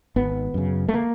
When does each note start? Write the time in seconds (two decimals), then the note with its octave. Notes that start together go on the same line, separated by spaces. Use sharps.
0.16 G#1 B3
0.54 F#2 C#3
0.88 A3
0.94 A#3